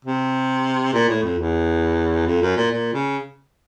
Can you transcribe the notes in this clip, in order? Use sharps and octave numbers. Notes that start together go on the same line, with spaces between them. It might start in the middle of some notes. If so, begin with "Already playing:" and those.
C3
A#2
A2
F2
E2
F2
F#2
A#2
A#2
C#3